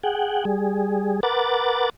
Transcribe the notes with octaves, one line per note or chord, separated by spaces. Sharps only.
G#4 F#5 G5
G3 G#4
A#4 B4 F#5 D6 A6